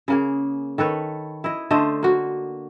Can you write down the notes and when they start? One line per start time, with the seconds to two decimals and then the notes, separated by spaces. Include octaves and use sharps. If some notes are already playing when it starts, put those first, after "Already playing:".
0.08 C#3 A#3 G#4
0.78 D#3 A4 B4 C#5
1.44 E4 D#5
1.71 D3 A3 C5 D#5
2.03 A#3 F#4